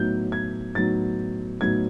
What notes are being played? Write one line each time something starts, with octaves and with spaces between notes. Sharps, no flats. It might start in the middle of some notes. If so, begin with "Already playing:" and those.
Already playing: A2 F#3 B3 D#4 G6
G#6
A2 F#3 B3 D#4 A6
A2 F#3 B3 D#4 G#6